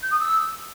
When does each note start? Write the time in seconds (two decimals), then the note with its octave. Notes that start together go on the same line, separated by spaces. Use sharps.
0.02 G6
0.11 D#6
0.19 E6